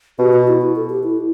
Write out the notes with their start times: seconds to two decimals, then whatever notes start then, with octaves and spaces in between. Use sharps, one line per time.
0.19 B2 G4
0.33 F#4
0.48 E4
0.61 F#4
0.76 A4
0.90 G4
1.03 E4